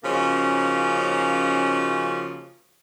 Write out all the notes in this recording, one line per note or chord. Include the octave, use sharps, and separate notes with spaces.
C#3 F3 A#3 C#4 D#4 F#4